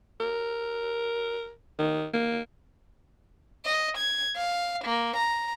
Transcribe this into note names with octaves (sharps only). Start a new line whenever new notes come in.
A#4
D#3
A#3
D#5
G#6
F5
A#3
A#5